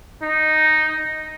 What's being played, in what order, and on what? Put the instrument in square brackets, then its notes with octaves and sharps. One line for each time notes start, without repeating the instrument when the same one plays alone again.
[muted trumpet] D#4